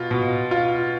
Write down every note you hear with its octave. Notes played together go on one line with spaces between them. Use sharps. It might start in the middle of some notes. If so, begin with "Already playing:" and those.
Already playing: B2 F4
B2
F4